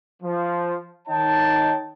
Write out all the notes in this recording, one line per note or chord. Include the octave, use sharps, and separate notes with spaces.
F3
D#3 D#4 C#5 D#5 G5 A5